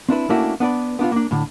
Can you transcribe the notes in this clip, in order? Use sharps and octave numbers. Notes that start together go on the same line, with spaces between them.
C4 D4 E4 B4
A3 A#3 C#4 D4 E4 F#4
B3 D4 B4 D5
B3 D4 D#4 F4
A#3 D4
A2 D3